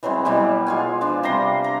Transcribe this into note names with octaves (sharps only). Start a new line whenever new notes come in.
E3 F#3 G#3 C4
B2 E3 F#3 G3
G#3 F4 G#5
F3 D4
C3 G3 A#5 C6
A#5